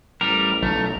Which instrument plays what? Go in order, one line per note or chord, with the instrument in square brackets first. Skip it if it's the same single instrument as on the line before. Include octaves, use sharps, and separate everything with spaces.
[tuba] A1 [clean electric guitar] G3 [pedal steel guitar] A#4
[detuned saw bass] B1 [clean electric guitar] A3